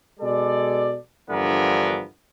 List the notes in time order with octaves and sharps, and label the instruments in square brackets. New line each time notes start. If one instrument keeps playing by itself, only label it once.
[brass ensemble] B2 G#3 A4 D5
G2 D3 E3 F3 B3 A#4